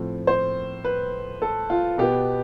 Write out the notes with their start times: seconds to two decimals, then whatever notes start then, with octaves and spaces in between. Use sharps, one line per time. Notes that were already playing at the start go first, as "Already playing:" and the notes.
Already playing: A2 F3 C4
0.27 C5
0.84 B4
1.42 A4
1.70 F4
1.98 B2 B3 G4